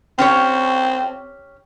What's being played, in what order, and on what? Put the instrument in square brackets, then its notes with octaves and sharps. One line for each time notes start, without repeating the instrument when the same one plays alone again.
[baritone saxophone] C4 [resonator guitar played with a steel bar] C#4 G4 C#5